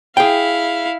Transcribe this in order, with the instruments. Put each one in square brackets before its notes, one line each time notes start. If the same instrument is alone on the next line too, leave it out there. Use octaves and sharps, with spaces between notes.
[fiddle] E4 F5 [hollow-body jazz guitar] G#4 G5